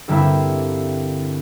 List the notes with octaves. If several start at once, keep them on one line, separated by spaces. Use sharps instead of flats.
G2 D3 G3 A#3 C4 E4